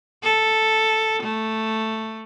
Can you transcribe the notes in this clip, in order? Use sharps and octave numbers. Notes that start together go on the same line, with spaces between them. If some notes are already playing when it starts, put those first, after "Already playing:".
A4
A3